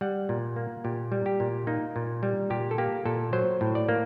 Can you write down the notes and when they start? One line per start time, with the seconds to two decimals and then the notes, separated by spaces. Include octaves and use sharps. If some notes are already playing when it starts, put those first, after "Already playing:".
0.01 G3 F#5
0.29 A#2
0.56 A#3
0.84 A#2 G4
1.12 G3
1.26 G4
1.40 A#2
1.67 A#3 D#4
1.96 A#2
2.23 G3
2.50 A#2 G4
2.71 A4
2.78 A#3 G4
3.05 A#2 A4
3.33 F#3 C5
3.61 A2
3.75 D5
3.89 A#3